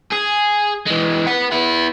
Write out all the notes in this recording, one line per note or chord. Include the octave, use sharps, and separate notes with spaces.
G#4
E3 G#3
B4 F#5
B3 E4